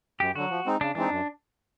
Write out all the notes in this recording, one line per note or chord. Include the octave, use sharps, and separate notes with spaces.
F#2 G4
D3 F#3 F#4
F3
G#3 C4 D#4
C#3 D4
E3 G#3 C4 D4 D#4
F#2